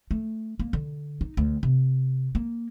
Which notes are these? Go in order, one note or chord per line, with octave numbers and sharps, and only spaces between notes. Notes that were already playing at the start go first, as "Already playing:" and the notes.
A3
A#3
D3
D#4
D2
C3
A#3